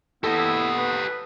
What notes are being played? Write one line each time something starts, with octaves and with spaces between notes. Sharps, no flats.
B3 E4 G4 A4 D#5
B4